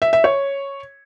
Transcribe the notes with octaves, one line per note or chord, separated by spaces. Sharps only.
E5
E5
C#5